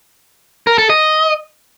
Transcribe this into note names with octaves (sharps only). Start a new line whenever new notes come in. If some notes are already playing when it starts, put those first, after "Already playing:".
A#4
A4
D#5